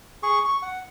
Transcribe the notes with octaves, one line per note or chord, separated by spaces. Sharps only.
G#4 C#6
C#6
F#5